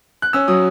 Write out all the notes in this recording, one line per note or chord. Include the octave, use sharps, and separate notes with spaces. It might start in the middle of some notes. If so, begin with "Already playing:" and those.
F#6
C#4 E6
F#3 D#6